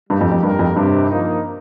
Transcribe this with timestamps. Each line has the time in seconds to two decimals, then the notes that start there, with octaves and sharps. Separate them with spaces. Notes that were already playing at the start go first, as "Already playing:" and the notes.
0.10 G2 G3 A#3 D#4 G4
0.21 F2
0.32 F2
0.43 G2 A#2 G3 D#4 G4 A#4
0.59 F2
0.76 G2 C3 D#3 C4 G4
1.09 F3 A#3 D#4